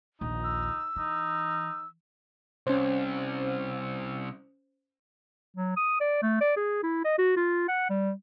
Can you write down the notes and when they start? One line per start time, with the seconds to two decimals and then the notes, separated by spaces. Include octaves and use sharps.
0.21 A#1 D#2 D#4
0.44 E6
0.96 E3 D#4
2.67 C2 C#4 C5
5.57 F#3
5.77 D#6
6.01 D5
6.22 A3
6.41 D5
6.57 G#4
6.83 E4
7.04 D#5
7.19 F#4
7.37 F4
7.68 F#5
7.90 G3